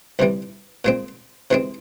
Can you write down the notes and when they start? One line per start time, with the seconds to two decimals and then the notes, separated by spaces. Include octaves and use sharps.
0.19 C2 C3 E3 G3
0.85 A#2 G#3 C4
1.51 C3 E3 G#3 C4